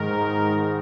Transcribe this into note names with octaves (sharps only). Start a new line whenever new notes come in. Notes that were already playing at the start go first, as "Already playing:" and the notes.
Already playing: G#2 D#3 A#4